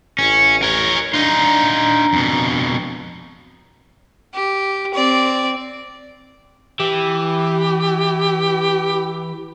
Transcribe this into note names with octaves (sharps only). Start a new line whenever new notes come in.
A1 C#4
A#4 C#5
D4 D#4 F4 A#5
F2 B2
G4
C4 D5
E3 G4